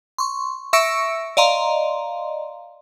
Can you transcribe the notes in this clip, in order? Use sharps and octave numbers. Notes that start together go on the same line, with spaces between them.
C6 C#6
E5 C#6 E6 A#6 C#7 D7
D5 D#5 F5 A#5 C6